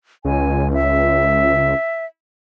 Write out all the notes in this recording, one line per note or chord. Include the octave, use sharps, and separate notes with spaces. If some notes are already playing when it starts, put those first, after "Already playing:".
C#2 G#5
E5